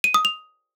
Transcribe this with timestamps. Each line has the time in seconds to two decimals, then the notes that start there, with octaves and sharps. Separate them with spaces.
0.04 D#7
0.14 D#6
0.25 F7